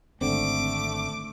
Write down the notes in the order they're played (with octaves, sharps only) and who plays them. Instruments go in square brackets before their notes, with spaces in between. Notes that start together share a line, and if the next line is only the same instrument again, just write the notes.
[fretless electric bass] G#1 D3 C4 [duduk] A3 [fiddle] D6